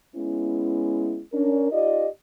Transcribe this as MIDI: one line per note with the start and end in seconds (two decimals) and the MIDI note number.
0.15 1.22 56
0.15 1.22 59
0.15 1.22 61
0.15 1.22 64
1.34 1.69 61
1.34 1.69 62
1.34 1.69 70
1.72 2.08 63
1.72 2.08 65
1.72 2.08 67
1.72 2.08 74
1.72 2.08 75